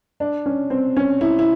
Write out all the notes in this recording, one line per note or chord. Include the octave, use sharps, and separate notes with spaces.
D4
C#4
C4
C#4
E4
E4